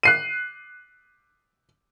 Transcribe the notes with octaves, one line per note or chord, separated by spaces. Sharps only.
F#6 C7 D#7